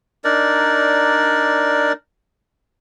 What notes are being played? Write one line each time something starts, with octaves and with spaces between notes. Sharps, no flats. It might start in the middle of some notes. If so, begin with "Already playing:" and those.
D4 D#4 A#4 D5